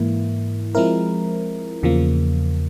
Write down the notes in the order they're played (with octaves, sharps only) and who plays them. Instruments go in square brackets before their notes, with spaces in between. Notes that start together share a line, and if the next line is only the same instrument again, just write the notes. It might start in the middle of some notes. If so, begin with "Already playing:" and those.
Already playing: [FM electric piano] G#2 E3 A#3 E4
F3 G#3 C4 E4 A#4
E2 C#3 F3 A#3